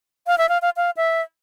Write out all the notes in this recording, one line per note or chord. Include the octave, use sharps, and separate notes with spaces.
F5
E5
F5
F5
F5
E5